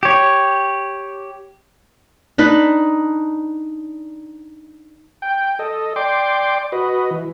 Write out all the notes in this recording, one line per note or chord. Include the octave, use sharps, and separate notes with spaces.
G4 C#5
D4 D#4 B4
G5
A4 D#5
D5 G5 C6 D6
F#4 B4 D#5
E3